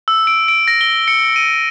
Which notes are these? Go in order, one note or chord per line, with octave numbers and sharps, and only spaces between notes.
E6
D7
D7
A#6
G7
C#7
D#7